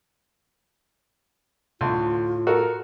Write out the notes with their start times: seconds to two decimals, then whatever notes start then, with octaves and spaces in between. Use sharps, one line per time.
1.81 D2 A2 F4
2.47 F#4 A4 A#4